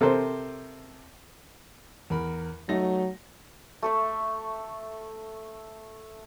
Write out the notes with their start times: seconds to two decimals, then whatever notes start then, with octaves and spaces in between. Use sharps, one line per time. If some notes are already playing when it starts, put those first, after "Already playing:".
0.01 C3 A4 A#4 C5
2.10 E2 A#4 B5
2.69 F#3 A3 D#4 A#6
3.83 A3 A4 E5